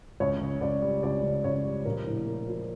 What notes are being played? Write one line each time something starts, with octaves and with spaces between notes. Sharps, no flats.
C#2 C#5
C#3
C#2 D5
G3
C#2 D5
C#3
C#2 C#5
G3
A#1 A#4
A2
A#3
F3